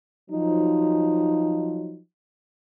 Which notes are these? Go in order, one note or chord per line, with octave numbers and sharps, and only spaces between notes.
F3 F#3 D#4